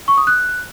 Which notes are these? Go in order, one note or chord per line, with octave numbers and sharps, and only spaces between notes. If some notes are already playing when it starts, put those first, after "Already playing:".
C#6
D#6
F#6